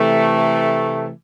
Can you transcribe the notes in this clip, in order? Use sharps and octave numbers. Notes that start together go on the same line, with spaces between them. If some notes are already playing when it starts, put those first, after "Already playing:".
Already playing: C3 E3 A3